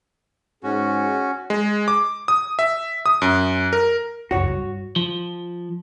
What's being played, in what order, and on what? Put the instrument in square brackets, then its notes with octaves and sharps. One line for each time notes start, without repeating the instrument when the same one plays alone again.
[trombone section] G#2 G#4 [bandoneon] C#4 F#4
[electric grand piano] G#3
D6
D#6
E5
D#6
F#2
A#4
[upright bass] C#2 F#2 [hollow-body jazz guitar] F#4 C#5
[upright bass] G2
[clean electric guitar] F3